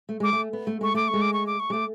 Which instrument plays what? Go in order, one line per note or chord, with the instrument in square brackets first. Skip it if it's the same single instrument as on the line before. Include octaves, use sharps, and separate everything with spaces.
[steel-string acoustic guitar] A3
[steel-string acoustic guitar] G#3 [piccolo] D6
[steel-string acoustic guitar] A3
B3
A3
[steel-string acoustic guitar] G#3 [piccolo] C#6
[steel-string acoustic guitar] A3 [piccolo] D6
[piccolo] C#6
[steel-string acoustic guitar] G#3
[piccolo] D6
C#6
D6
C#6
[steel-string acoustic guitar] G#3 A3 [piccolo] D6